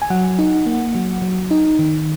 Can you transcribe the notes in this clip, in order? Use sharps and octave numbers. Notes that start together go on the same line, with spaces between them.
G#5
F#3 F#5
D#4
A#3
F#3
F#3
D#4
D#3